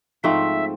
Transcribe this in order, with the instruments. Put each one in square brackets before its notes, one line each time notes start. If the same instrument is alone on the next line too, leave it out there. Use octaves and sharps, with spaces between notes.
[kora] G#2 F3 A3 C4 [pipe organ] E5